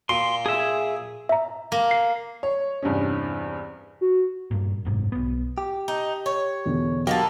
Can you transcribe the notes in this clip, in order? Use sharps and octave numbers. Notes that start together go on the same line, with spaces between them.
A#2 C6
G#4 E5
E5 A#5
A#3
C7
C#5
E2 G2 C3 C#4
F#4
G2 A#2
F#1 G#2 C3
B1 B3
G4
D#4
C#5
E2 B2 D3
F#3 A#3 B3 D#4 G4 A4